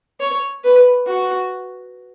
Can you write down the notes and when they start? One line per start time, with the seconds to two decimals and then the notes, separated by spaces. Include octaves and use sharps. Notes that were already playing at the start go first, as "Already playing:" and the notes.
0.20 C#5
0.64 B4
1.07 F#4